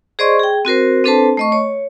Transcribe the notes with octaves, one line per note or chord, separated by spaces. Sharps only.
G#4 C5 D5 D#5 C6 C#6
G#4 G5
C4 F#4 A#4 C5
C4 D4 A4 B4 C5 A5
A3 D#5 C#6
C#5